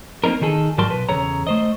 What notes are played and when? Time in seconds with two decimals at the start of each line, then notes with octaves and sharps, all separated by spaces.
0.24 A#3 C4 D4 D#4 A#4
0.41 D#3 D#4 G#4 A4
0.78 G#2 F#3 G3 A#4 A5 C6
0.91 B1 B4
1.09 E2 C#3 A4 C#5 A#5
1.47 A3 C5 D#5